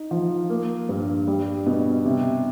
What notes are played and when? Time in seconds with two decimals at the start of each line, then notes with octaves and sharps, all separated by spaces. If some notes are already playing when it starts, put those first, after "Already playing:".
Already playing: D#4
0.11 F3
0.50 A#3
0.89 G2
1.27 G3
1.66 B2
2.05 C3